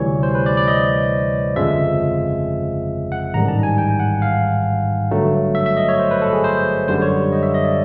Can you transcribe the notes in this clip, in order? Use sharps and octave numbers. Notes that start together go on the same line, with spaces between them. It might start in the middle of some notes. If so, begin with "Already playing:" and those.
Already playing: D2 C3 E3 G3 C#5
C5
B4
D5
D5
D#5
G1 F2 C#3 F3 G#3 E5
F#5
A1 G#2 D#3 G3 A#5
A5
G#5
G5
F#5
F5
G1 G2 D3 F#3 A3
E5
E5
D#5
C#5
C5
B4
A4
G#4
C5
F#2 D3 G3 C5
C#5
D#5
E5
D#5
D5